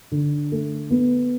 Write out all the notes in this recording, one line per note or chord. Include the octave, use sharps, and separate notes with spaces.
D3
A3
B3